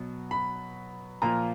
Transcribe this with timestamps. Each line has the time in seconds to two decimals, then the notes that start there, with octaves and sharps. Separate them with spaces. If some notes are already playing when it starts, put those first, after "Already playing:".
Already playing: B2 F#3 B3
0.31 B5
1.22 A#2 F3 A#3 F4 A#5